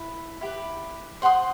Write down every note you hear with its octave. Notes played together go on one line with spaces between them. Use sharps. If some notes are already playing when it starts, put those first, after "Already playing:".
Already playing: E4 B4
E4 G4 B4
C5 F#5 C6 D#6